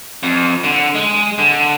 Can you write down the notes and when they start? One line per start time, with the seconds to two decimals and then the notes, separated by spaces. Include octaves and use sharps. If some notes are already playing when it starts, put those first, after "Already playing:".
0.23 F2
0.64 D3
0.95 G#3
1.38 D3